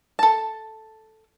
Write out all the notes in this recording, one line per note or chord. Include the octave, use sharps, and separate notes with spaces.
A4 A5